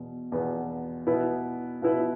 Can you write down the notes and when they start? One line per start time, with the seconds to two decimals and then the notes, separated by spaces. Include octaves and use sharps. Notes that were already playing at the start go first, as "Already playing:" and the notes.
Already playing: E2 B2
0.32 E2 B2 B3
1.07 B2 B3 E4 B4
1.82 B2 B3 E4 B4